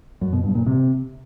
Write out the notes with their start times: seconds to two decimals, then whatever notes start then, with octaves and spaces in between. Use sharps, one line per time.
0.21 F#2
0.33 B2
0.44 G2
0.55 A#2
0.66 C3